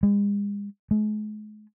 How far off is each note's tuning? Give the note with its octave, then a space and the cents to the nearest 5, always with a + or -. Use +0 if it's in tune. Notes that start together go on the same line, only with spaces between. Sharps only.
G#3 -40
G#3 +40